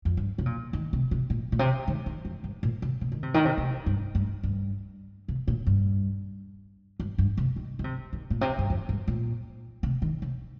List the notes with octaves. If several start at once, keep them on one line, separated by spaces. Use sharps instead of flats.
F2
G2
C3
A#2
D#3
C3
C3
A#2
A#2
C3
D#3
D#3
F2
G2
A#2
C3
C3
D#3
C3
D#3
C3
C3
G2
G2
G2
C3
A#2
G2
G2
G2
C3
D#3
D#3
C3
D#3
A#2
C3
G2
F2
G2
A#2
C3
D#3
C3